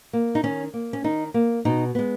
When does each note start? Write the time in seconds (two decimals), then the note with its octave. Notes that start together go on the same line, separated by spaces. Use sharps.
0.13 A#3
0.35 D#4
0.43 D#3 C#4
0.74 A#3
0.93 C#4
1.04 D#3 D#4
1.34 A#3
1.65 B2 D#4
1.95 G#3 B3